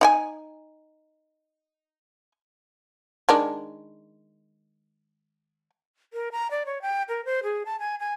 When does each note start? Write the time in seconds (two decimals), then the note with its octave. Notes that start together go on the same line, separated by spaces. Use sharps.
0.01 D#4 G5 G#5
3.29 D#3 G#3 D4
6.13 A#4
6.32 A#5
6.51 D5
6.66 C#5
6.82 G5
7.09 A#4
7.25 C5
7.43 G#4
7.66 A5
7.80 G#5
8.00 G#5